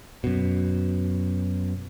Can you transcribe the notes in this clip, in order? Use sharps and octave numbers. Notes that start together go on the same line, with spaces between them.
F#2 B2